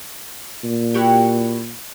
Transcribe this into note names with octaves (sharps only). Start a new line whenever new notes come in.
A#2
E4 F#4 G4